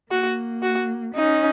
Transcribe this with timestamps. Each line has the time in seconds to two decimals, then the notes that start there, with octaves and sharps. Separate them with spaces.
0.11 A#3 F#4
0.62 F#4
1.15 C#4 D#4